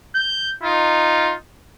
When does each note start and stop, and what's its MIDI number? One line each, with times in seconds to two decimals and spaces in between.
0.15 0.51 91
0.63 1.35 63
0.63 1.32 65